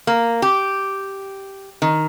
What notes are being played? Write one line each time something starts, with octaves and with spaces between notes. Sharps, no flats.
A#3
G4
D#3